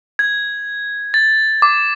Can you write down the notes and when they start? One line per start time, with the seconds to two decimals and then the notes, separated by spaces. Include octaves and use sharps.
0.19 G#6
1.14 A6
1.62 D6